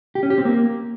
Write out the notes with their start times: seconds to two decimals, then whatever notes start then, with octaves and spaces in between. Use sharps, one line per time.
0.15 G4
0.23 C#4
0.30 G4
0.38 C4
0.45 A#3